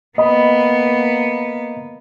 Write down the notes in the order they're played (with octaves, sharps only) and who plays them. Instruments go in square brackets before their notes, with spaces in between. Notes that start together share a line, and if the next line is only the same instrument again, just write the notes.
[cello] A#3 B3 [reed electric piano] D#5 B5